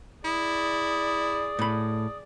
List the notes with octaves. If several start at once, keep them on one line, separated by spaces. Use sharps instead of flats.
E4 G#4 D5 D#6
A2 B5